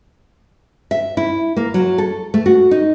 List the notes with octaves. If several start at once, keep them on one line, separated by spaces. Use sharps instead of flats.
E5
E4
A#3
F#3
A4
A3
F#4
D#4